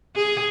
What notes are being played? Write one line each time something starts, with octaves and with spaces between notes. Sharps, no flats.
G#4